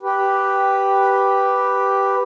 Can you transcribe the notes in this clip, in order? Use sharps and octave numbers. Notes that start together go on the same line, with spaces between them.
G4 B4